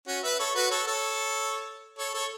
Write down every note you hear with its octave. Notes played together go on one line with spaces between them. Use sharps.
C#4 F#4
B4 E5
A4 C#5
F#4 B4
A4 C#5
A4 C#5
A4 C#5
A4 C#5